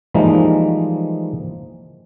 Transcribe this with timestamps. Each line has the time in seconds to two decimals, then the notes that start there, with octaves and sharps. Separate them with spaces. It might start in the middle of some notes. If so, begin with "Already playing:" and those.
0.14 E3 F3 G3 G#3 A#3 D#4